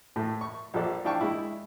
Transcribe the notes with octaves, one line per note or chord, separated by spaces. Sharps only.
A2 A3
C#6
A#1 F3 A4 D5
D4 E4 F5 G5 A5 C#6
G#3 E4